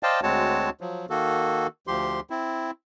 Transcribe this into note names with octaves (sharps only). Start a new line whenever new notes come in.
C5 D5 D#5 F5 G5 A5
D2 G#3 C4 F#4 C#5 A5
F3 F#3
D#3 A#3 F#4 A4
D2 F3 G4 C6
C4 E4